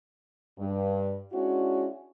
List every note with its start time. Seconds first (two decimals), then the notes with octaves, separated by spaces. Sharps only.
0.59 G2
1.32 G#3 C#4 D4 E4 F#4